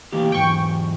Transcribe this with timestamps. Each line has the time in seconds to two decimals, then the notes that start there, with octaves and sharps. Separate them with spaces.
0.13 E3 A#3 G4
0.32 E2 G#2 G5 C#6